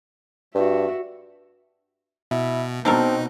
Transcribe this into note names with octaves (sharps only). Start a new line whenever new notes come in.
G2 F#4 E5
B2 E4
B2 C4 D4 D#4 A4 A#4